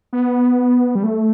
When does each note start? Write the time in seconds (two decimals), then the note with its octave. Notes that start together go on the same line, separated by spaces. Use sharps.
0.13 B3
0.95 G3
1.03 A3